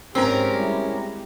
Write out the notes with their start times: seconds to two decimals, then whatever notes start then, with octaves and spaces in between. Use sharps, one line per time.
0.15 G#2 G#3 C4 C#4 G4 A#4
0.53 G3 E4